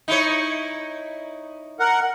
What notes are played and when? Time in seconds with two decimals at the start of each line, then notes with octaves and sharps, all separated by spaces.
0.08 D#4 E4 C#5
1.80 A#4 F#5